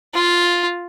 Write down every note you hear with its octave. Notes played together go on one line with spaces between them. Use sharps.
F4